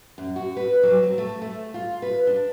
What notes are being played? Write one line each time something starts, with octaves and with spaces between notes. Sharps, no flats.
F#2
F#4
B4
F#3
C4
A3
A3
F4
B4
D4